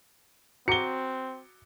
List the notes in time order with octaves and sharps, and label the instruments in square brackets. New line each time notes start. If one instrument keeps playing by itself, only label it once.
[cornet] C4 [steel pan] F#4 A#5 D6 [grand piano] C#7 G7